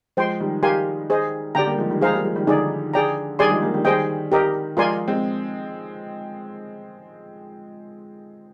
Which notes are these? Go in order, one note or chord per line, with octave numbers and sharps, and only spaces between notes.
F3 G#3 C5 G5 C6
D#3 G3
G4 A#4 F5 G#5 C6
G#4 C5 D#5
D3 G4 D5 G5 A#5
G3 A#3
F3 G#3
D#3 G3
F3 G#3 G#4 C5 F5 A#5
G3 A#3
F3 G#3
D#3 G3
D3 F3 D#4 G#4 D5
G#4 D5 G5 A#5
D#3 G3 G#4 D5 G#5 C6
F3 G#3
G3 A#3
D#3 G3
D#3 G3 G#4 C5 D#5 G5
G4 A#4 D#5
F3 G#3 F4 A#4 D5 G#5 C6
G#3 C4